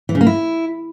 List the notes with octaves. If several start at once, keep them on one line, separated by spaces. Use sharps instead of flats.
E3
C#3
A#3
E4